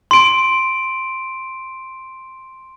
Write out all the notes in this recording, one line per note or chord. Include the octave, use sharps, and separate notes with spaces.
C6 D7